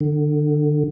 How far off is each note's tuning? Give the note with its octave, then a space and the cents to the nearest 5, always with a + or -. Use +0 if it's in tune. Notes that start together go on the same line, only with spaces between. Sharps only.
D3 +25